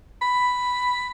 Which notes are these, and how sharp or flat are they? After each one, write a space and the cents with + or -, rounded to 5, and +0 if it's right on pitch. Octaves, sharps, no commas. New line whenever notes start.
B5 +5